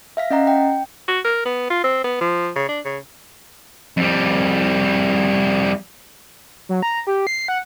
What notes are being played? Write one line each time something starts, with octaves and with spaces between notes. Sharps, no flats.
E5 F5 B6
C#4 D#5 F#5 A#5
G5
F#4
A#4
B3
F4
C4
B3
F3
C#3
D4
C#3
F2 G3
F#3
A#5
G4
C7
F#5